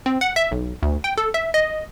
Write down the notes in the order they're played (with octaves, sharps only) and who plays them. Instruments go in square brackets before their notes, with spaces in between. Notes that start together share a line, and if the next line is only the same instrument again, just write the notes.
[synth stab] C4
F#5
E5
B1
D2
G5
A4
E5
D#5